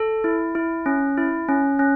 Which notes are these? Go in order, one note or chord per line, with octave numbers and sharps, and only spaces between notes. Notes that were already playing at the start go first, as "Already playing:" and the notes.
Already playing: A4
E4
E4
C#4
E4
C#4
C#4